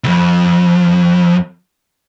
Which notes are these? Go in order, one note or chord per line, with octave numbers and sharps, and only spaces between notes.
C2 F2